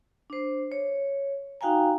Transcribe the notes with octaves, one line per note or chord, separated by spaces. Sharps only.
D4 C5
C#5
D#4 F#4 F5 G5 G#5 A#5